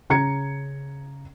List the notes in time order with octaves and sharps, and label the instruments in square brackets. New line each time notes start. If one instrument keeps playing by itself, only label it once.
[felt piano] C#3 A#5 G#6 C#7